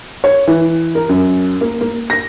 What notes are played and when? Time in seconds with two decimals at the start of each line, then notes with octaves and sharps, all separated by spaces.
0.24 C#5
0.47 E3
0.95 A#4
1.09 F#2
1.61 A#3
1.81 A#3
2.10 A#6